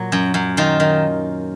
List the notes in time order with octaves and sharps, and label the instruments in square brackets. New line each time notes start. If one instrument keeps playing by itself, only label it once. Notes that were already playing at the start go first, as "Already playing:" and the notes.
Already playing: [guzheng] A#2 F#3
F#2
F#2
D#3 F4
D#3